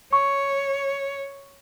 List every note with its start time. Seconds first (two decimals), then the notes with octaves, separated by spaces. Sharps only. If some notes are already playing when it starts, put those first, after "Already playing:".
0.13 C#5 C#6